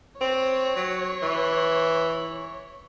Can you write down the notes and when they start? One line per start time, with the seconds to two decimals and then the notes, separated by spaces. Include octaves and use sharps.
0.21 C4 C#5
0.76 F#3
1.22 E3